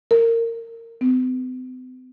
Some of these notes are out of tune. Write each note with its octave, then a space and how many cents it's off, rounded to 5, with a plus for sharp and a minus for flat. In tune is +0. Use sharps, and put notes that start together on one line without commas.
A#4 -20
C4 -45